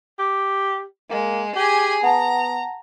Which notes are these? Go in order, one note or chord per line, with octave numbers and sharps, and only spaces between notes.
G4
G#3 A#3
G4 G#4 G#5
B3 F#5 A5 A#5